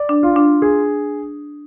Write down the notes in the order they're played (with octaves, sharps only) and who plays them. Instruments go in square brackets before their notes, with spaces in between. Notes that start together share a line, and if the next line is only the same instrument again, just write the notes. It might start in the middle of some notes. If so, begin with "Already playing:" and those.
Already playing: [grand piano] D5
[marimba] D4
[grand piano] F4
[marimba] D4
[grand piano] G#4